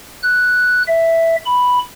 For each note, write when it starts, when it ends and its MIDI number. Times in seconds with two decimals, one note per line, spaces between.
0.23 0.83 90
0.88 1.36 76
1.46 1.79 83